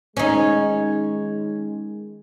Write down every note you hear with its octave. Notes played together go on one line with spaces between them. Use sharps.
D#3 G#3 C#4 D#4